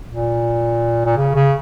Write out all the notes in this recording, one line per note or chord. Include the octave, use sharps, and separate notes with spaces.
A#2
A#2
C#3
C#3